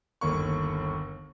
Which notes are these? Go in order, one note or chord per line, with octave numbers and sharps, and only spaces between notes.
G1 D#2 A#3 C#6